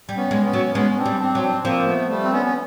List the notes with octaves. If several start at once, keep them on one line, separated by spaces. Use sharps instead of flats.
G3
B3 C#4
G#3
B3 C#4
F#3
G#3 B3 C#4
C#4
C4 D4
G3
C4 D4
F#3
C4 D4
F3 A#3 C4
A3 B3
G3 A3
C4
B3 C#4
C#4